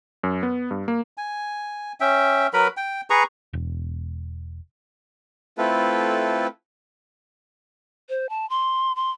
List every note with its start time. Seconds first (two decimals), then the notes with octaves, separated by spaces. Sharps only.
0.23 F#2
0.43 B3
0.71 G2
0.88 A#3
1.18 G#5
2.00 C#4 E5 G5
2.53 F#3 A#4 B4 B5
2.77 G5
3.10 G#4 B4 A#5 C#6
3.53 E1
5.58 A3 C4 E4 F4 A4 B4
8.09 C5
8.29 A5
8.50 C6
8.96 C6